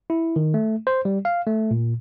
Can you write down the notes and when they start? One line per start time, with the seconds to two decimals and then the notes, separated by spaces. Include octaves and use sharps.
0.10 E4
0.36 D#3
0.54 A3
0.87 C5
1.05 G3
1.25 F5
1.47 A3
1.71 A#2